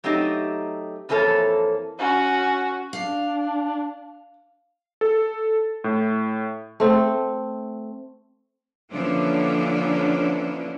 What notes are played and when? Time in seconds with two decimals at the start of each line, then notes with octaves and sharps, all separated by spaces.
0.04 F#3 A3 C4 D#4 G4 D#5
1.09 F2 E3 A#3 A4 C#5 A5
1.99 C#4 F#4
2.93 D4 F5
5.01 A4
5.84 A2
6.80 A3 C4
8.91 D3 E3 F3 A#3 C#4 D4